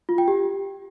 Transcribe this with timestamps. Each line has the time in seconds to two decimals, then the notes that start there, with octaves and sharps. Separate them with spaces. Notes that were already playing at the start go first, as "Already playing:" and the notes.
0.09 F4
0.18 G5
0.28 G4